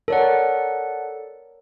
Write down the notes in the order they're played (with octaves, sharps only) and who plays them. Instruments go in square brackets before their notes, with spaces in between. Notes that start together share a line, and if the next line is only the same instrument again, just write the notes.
[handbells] A4 D5 F#5 [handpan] A#4 C#5